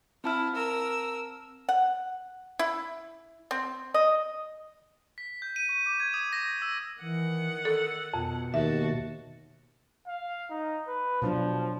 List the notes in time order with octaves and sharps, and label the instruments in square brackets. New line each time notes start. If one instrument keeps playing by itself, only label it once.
[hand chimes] C4 A5 F6 [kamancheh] E4
[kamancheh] A#4 E6
[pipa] F#5
E4
C4
D#5
[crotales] B6
G6
D#7
C#6
D6
G#6
D#6
A#6
E6
[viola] D#3 F#5 [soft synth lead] E3
[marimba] A4 [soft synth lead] E6
[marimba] F2 [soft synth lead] B2
[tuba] D#2 [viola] F#4 A5 [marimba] E5
[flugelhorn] F5
D#4
B4
[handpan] B2 F#3 D4 [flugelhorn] F3